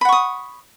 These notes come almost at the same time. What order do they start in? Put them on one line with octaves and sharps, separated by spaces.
B5 F#5 C#6 D#6